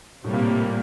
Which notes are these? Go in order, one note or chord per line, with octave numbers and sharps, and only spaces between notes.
A2 C3 G3 A#3
A#2
A2